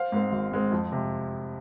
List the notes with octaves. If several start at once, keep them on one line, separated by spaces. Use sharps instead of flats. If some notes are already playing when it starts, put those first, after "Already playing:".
Already playing: C5 F5
G#2 G#3 C4
G#1
G#2 G#3 C4
F2
C3